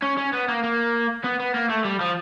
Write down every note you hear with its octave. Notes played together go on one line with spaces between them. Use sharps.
C#4
C#4
B3
A#3
A#3
B3
B3
A#3
A3
G3
F3